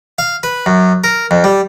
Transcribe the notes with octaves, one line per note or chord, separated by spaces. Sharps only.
F5
B4
F#2
A#4
F2
G3